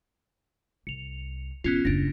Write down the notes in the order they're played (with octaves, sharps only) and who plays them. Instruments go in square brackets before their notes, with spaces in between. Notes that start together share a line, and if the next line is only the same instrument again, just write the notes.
[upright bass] C2 [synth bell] C#7 F7
[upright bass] E1 F3 [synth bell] B3 C#4 F4
[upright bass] F#1 D#2 [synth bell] D4 A#6